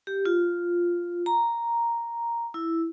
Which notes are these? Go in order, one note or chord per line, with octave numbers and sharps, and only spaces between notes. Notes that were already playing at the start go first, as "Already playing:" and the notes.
G4
F4
A#5
E4